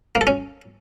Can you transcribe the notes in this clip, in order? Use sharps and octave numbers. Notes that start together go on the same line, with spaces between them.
A#3
A4
C#4